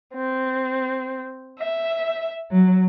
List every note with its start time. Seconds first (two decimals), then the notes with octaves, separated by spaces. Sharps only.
0.14 C4
1.59 E5
2.51 F#3